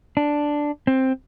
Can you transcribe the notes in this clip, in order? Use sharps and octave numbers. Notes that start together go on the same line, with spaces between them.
D4
C4